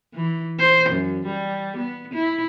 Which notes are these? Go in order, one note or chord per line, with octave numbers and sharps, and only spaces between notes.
E3
C5
F#2
G3
B3
E4